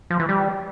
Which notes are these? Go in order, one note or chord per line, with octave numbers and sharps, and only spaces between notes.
F3
E3
G3